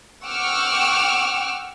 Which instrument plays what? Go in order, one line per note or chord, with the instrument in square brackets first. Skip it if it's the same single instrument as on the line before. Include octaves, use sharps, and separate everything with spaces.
[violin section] F#5 G5 C#6 D6 E6 F6